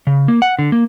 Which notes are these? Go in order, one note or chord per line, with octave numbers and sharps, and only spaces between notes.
C#3
A#3
F#5
D3
A#3